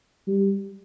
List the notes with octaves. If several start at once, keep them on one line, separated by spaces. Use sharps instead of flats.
G3